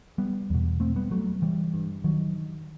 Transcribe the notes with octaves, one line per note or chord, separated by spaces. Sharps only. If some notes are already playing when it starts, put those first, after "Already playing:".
G3 B3
E2 B2
A3 C4
G3 B3
F#3 A3
E3 G3
G2
D#3 F#3